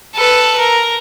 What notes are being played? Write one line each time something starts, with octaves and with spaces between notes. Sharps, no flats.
A4 B4
A#4